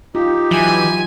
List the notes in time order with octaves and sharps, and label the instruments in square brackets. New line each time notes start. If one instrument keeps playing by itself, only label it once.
[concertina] D#4 G4 [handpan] F4
[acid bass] E3 [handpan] F#3 [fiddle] G#5